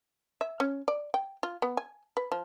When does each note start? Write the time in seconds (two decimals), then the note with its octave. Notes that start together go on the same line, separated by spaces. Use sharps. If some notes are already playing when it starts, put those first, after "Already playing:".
0.41 E5
0.60 C#4
0.88 D5
1.14 G5
1.43 F4
1.62 B3
1.77 G#5
2.17 B4
2.32 F3